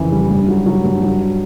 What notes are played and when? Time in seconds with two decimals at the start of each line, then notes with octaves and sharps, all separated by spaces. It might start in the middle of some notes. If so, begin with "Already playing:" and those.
Already playing: F2 C#3 E3
0.12 G3
0.30 G2
0.48 F#3
0.66 F#3
0.84 G2
1.03 F#3
1.21 F#4